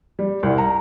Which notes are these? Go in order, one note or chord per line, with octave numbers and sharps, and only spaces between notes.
G3
C2
A#5